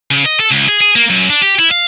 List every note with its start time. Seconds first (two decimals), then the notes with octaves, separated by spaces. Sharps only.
0.11 C#3
0.25 D#5
0.40 A4
0.51 C#2
0.68 G#4
0.81 G#4
0.96 A#3
1.10 F#2
1.30 D4
1.42 G4
1.59 E4
1.71 F5